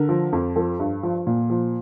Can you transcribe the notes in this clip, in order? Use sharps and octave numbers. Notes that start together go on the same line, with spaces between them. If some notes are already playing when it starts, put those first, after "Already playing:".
Already playing: D3 A#4
F3
F2
F3 A4
G2
F3
A#2
F3